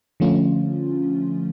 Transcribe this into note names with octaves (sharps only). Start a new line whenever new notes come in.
D3 F3 A3 C#4 F4